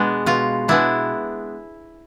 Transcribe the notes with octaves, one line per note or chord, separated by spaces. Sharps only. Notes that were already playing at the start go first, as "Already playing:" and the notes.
Already playing: B2 G#3 B3 D4
B2 F4
G#3 B3 D4 E4